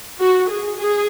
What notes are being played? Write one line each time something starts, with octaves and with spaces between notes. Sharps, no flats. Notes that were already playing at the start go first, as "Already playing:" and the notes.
F#4
G#4
G#4